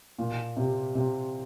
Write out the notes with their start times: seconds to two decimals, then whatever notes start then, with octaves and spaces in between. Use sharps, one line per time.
0.19 A#2
0.57 C3
0.95 C3